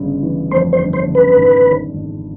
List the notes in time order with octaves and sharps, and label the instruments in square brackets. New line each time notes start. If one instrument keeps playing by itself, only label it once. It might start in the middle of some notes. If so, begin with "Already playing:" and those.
Already playing: [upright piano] G1 C#3
E3
[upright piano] F2 [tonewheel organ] C5
[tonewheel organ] C5
[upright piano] G1
[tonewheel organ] C5
[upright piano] C#3
[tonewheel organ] B4
[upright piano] G#1
D#3
G#1